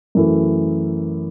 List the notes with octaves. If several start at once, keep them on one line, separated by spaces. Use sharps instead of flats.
F#2 E3 A3